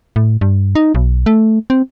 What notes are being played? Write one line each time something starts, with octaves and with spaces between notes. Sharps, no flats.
A2
G2
D#4
B1
A3
C4